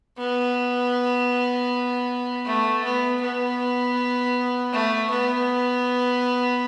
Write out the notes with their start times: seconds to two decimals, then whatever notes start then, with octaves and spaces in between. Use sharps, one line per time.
0.18 B3
2.45 A3
2.84 B3
3.21 B3
4.73 A3
5.11 B3